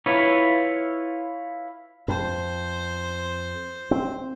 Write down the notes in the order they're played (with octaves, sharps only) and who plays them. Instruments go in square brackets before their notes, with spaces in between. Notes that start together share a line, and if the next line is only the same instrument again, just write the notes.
[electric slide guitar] E4 F4 B4 C#5
[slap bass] F2 [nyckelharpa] C5
[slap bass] C4